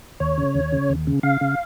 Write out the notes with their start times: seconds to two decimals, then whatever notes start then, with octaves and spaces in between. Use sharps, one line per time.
0.20 D#2 C#5
0.38 C#3
0.55 D#2
0.72 C#3
0.90 D#2
1.07 C#3
1.23 C#3 F5
1.41 C#3